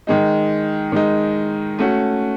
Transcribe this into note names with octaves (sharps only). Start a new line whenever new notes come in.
D#3 G#3 D#4
D#3 G#3 D#4
A3 C#4 F#4